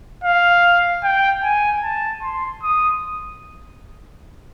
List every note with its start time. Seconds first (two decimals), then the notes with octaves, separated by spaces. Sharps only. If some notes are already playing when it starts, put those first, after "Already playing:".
0.24 F5
1.04 G5
1.43 G#5
1.83 A5
2.23 C6
2.63 D#6